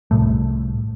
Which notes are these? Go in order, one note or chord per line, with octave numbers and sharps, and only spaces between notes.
C2 A2 A3